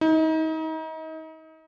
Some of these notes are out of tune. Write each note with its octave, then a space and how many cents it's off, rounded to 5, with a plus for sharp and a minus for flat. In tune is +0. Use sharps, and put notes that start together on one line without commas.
D#4 +35